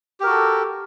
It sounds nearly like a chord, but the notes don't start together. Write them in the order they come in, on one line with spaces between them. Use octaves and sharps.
G4 A#4 F#4 A4